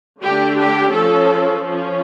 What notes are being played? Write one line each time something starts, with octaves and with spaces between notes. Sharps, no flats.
D3 A3 D4 G4
G4
F3 C#4 A4
F3 C#4